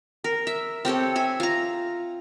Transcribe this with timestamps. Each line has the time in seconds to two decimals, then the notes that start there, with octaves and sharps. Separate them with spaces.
0.24 A#4
0.47 E5
0.85 C4 G4 A4 C#5
1.16 E5 G#5
1.40 F4 A#5